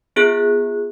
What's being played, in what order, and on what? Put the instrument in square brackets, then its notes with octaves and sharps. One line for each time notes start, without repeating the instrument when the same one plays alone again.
[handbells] B3 F4 G#4 F#6